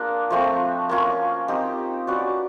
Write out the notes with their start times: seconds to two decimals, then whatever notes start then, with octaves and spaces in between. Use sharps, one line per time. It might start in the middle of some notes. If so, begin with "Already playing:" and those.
Already playing: A#3 D4 F4 G#4
0.30 F3 A3 C4
0.89 A#3 C#4 F4
1.48 C4 D#4 G4
2.07 C#4 F#4 B4 D5